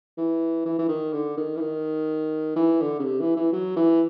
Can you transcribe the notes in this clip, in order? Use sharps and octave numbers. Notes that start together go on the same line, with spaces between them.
E3
E3
E3
D#3
D3
D#3
E3
D#3
E3
D3
C#3
C3
E3
E3
F#3
E3